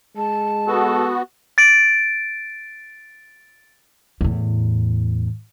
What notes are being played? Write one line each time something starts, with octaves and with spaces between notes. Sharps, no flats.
G#3 A5
B3 F#4 A4
A6 D7
E2 A2